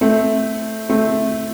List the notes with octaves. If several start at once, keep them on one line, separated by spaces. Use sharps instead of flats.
A3 C4
A3 C4